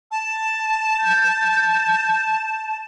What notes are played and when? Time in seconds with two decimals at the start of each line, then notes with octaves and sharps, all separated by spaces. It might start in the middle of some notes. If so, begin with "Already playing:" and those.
0.11 A5
1.01 G6